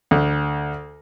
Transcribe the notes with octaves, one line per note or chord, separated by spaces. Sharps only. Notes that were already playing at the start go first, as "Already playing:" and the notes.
D2